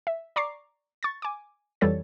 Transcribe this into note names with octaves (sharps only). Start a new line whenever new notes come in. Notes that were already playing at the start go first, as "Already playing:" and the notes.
E5
D5 A#5 C#6 D6 C7
C#6 A6
G#5 D6
F2 E3 G3 A4 C#5 A6